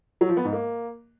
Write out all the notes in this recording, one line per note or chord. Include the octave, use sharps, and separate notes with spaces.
F#3
F3
B3
G#2
A#3